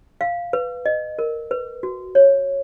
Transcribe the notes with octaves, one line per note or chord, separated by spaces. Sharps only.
F5
B4
D#5
A#4
B4
F#4
C#5